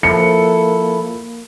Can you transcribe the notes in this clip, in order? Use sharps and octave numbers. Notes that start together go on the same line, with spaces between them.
F3 A#3 E4 A4 C#7